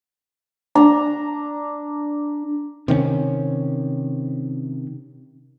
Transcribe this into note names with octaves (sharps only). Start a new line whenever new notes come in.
D4 A#5
C3 D#3 C4 C#4